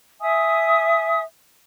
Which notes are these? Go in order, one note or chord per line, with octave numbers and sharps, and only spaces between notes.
E5 G#5 D#6